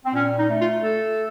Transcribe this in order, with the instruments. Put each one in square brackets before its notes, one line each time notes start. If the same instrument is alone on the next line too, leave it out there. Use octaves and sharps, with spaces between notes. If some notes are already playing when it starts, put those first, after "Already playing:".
[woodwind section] C4
A#2 C#4
D#4
A3
F4
A3 A4